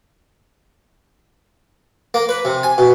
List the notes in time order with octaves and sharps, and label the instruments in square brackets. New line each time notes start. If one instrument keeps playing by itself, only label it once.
[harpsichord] A#3
B4
C3
G#5
B2